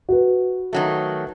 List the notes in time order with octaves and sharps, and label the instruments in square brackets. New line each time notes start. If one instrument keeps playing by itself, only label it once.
[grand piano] F#4 B4
[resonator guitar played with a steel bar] D#3 F#3 A3